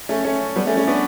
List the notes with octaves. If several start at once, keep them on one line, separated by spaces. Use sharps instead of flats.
A3 C#4
A3 C#4
G3 B3
A3 C#4
A3 C#4
B3 D4